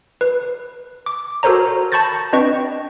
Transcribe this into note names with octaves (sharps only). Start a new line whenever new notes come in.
B4
D6
F#4 A4 A#4 C5 C#5 A#5
A5 B5 C#6 G6 A6 A#6
C4 D4 B4 D#5 G5 C#6